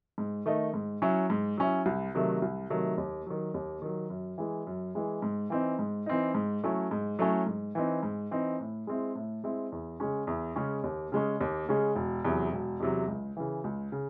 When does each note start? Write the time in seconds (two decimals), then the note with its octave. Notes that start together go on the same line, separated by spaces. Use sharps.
0.18 G#2
0.46 D#3 A3 D#4
0.74 G#2
1.02 F#3 C#4 E4
1.30 G#2
1.57 F#3 C#4 E4
1.86 C2
2.15 C3 D#3 F#3 A3
2.42 C2
2.70 C3 D#3 F#3 A3
2.98 D#2
3.26 D#3 F#3
3.54 D#2
3.82 D#3 F#3
4.10 F#2
4.38 E3 G#3
4.67 F#2
4.95 E3 G#3
5.22 G#2
5.50 E3 C4 D#4
5.79 G#2
6.06 E3 C4 D#4
6.35 G#2
6.63 F#3 A3 C#4 E4
6.91 G#2
7.19 F#3 A3 C#4 E4
7.47 G#2
7.75 E3 C4 D#4
8.03 G#2
8.31 E3 C4 D#4
8.60 A2
8.87 G#3 C4 E4
9.15 A2
9.44 G#3 C4 E4
9.72 E2
10.00 C#3 G#3 C#4
10.27 E2
10.56 C#3 G#3 C#4
10.84 D#2
11.12 C#3 G#3 C#4
11.41 D#2
11.69 C#3 G#3 C#4
11.96 E1
12.25 E2 C3 F#3
12.52 E1
12.80 E2 C3 F#3
13.08 C#2
13.37 C#3 E3
13.64 C#2
13.92 C#3